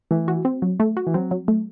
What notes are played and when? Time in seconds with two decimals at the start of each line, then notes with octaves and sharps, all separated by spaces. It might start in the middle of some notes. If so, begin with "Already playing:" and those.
0.11 E3 A3
0.28 F#4
0.45 C4
0.62 F#3
0.80 A3
0.97 F#4
1.07 E3
1.14 F#3 C4
1.31 F#3
1.48 A3